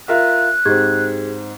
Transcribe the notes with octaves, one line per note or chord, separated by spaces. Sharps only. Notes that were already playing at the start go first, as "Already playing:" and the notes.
F4 A#4 E5 F#6
G#2 C4 G4 G#4 G#6